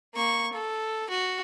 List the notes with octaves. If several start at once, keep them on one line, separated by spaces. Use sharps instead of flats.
A#3 C#6
A4
F#4